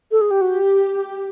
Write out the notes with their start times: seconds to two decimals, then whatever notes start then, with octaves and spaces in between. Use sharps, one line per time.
0.12 A4
0.21 G#4
0.31 G4
0.41 F#4 G4